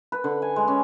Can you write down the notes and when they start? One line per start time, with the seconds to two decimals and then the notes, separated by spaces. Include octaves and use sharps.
0.12 B4
0.24 D3
0.42 G#5
0.56 G#3
0.68 C#4